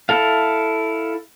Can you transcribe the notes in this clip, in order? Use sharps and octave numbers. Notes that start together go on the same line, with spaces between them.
E4 A4 F5